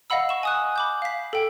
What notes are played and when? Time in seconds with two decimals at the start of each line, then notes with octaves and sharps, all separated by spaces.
0.10 D#5 F5 F#5 B5 E6
0.29 C#6 E7
0.43 G#5 D#6 F#6
0.76 B5 D6 G6
1.02 F5 B6
1.33 A4 G5